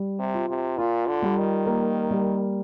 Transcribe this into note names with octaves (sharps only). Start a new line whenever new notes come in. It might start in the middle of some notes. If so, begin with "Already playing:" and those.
Already playing: G3
C3
F4
C3
A#2 F4
D3
G3
D#3
A#3
G3